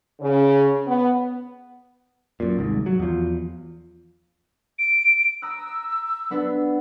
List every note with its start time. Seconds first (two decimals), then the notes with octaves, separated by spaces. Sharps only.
0.21 C#3
0.87 B3
2.40 F#2 A#2
2.57 D#1 C2 G#2
2.86 F#3
2.99 E2 F3
4.79 D7
5.42 A#5 D#6 E6 F#6
6.30 B3 D4 B4